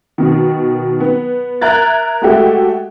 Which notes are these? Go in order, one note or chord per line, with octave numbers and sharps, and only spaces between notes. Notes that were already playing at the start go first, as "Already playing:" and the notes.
B2 D#3
B3
A#4 E5 A#5 F#6 G#6 A6
G#3 A3 F#4 G4 A4